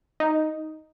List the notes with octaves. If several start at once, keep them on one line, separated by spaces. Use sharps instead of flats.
D#4